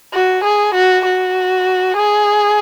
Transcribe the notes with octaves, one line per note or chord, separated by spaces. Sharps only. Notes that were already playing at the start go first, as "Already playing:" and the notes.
F#4
G#4
F#4
F#4
G#4